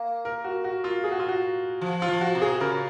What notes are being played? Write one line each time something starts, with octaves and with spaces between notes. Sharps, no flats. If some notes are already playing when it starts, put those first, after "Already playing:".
Already playing: A#3
A#4
F#4
F#4
F4
G#4
F#4
F4
F#4
F3
F4
F3
F#4
C3
G#4
C#3 A#4